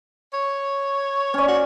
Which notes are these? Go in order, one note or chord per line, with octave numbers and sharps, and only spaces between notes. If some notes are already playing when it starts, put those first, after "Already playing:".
C#5
C#4 D5
F#4